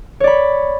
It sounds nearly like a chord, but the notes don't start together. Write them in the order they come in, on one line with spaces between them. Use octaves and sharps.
C#5 D5 B5